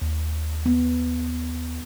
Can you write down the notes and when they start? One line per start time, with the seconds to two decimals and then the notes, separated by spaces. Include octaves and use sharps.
0.02 D#2
0.66 B3